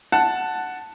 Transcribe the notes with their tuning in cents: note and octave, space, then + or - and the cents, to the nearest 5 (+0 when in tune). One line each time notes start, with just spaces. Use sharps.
F#5 +0 A5 +0